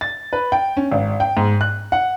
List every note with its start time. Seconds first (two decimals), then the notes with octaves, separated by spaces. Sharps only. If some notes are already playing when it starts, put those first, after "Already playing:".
0.01 A6
0.33 B4
0.52 G5
0.77 C#4
0.91 G#1
1.20 G5
1.37 G#2
1.61 F#6
1.92 F#5